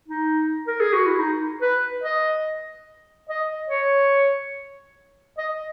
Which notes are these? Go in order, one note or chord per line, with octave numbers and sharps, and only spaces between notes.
D#4
A#4
G#4
F#4
E4
D#4
B4
D#5
D#5
C#5
D#5